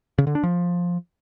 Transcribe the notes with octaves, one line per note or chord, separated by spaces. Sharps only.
C#3
D3
D4
F3